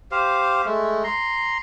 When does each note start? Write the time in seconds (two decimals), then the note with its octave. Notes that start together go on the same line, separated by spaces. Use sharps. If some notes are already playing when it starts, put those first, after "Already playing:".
0.11 G4 C5 F5
0.66 G#3 A3
1.04 A#5 C6